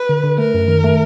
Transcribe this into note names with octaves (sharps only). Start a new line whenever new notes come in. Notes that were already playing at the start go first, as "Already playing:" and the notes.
Already playing: B4
D3
D3
A3 A#4
F#2
D#3
A3